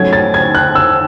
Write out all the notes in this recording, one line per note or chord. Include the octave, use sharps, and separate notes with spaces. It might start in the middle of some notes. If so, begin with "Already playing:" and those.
Already playing: G#2 F#3 A3 C#4 G#6
A6
G#6
F#6
E6